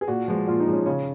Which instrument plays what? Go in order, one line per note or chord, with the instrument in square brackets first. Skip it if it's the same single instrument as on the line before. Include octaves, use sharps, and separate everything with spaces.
[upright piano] G#4
A#2 F#4
F3 G#3
A#2 F4
D#4
F3 G#3
C#4
C#3 C#4